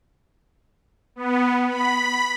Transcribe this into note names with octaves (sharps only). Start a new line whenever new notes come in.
B3
B5